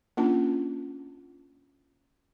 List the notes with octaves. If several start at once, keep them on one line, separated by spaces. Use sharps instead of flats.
A#3 C#4 D4 F4 A5